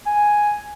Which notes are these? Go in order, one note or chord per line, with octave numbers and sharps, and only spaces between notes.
G#5